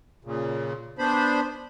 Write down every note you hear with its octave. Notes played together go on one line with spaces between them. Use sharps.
A#2 C#3
B3 D4 C5 B5